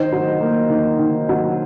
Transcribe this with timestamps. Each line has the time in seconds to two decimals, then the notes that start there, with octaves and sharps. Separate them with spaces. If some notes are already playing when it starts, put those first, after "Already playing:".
Already playing: D#3 C5 D#5
0.12 F#3
0.41 A#3
0.70 D#3
0.99 D#3
1.29 F#3